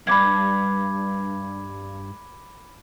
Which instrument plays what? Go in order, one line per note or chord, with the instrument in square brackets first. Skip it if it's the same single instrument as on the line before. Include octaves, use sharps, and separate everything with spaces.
[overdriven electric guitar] B1 G2 [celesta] B5 D6 G#6